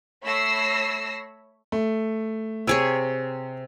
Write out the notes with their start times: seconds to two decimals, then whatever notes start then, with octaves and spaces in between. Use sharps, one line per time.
0.23 A3 C#5 B5 E6 A#6 C7
1.72 A3
2.67 C3 G#4 C#5 E6 D7